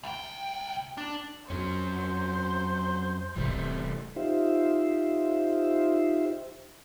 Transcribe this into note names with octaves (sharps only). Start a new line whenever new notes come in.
C2 G5
D4
F2 F#3 C#4 C5
D1 C3 E3 G3 A3 C4
D#4 F4 G4 C5 E5